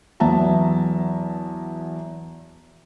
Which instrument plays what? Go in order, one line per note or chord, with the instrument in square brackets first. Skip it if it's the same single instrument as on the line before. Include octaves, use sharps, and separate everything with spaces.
[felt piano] E2 F#3 B3 E5 A5 A#5